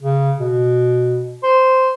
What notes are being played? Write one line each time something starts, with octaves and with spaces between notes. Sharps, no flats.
C#3
B2
C5